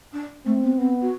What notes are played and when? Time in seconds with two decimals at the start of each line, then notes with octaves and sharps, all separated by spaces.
0.12 D4
0.45 A3 C4
0.62 B3
0.78 B3 C4
1.01 F#4